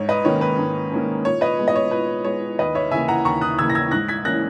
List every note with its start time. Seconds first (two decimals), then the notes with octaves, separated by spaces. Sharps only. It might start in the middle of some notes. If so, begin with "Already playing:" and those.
Already playing: G#2 C#5
0.09 B4 D#5
0.25 D#3 A#3 C#4 C#5
0.41 B4
0.58 G#2
0.92 D#3 A#3 C#4
1.25 A#2 C#5
1.41 B4 D#5
1.59 G#3 B3
1.68 D#5
1.76 C#5
1.91 A#2 B4
2.24 G#3 B3 C#5
2.59 D#2 B4 D#5
2.74 C#5 E5
2.91 C#3 E3 A#3 E5 G#5
3.08 F#5 A#5
3.25 D#2 A#5 C#6
3.41 D#6 F#6
3.59 C#3 E3 A#3 E6 G#6
3.70 A#6
3.75 E6 G#6
3.91 G#2 F#6 A#6
4.08 G#6 B6
4.25 E3 A#3 C#4 F#6 A#6